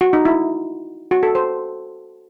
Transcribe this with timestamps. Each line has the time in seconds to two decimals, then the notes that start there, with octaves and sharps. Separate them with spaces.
0.01 F#4
0.13 D#4
0.25 E4
1.11 F#4
1.23 A4
1.35 C5